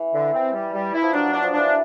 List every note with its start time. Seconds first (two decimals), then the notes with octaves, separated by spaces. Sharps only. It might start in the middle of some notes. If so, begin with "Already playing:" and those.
Already playing: E3
0.13 D3
0.33 C4
0.53 G3
0.73 G3
0.94 E4
1.02 F3
1.13 F#3 D4
1.27 F#3
1.33 D4
1.43 F3
1.53 E3 D4